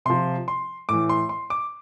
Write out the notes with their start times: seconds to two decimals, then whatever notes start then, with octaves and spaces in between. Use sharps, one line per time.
0.05 C3 F3 C6
0.48 C6
0.89 A2 E3 D6
1.09 C6
1.29 C6
1.50 D6